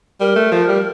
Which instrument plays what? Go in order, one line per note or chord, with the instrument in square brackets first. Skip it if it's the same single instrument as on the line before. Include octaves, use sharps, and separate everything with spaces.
[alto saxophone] G3 [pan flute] A#4
[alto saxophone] A3
F3
G3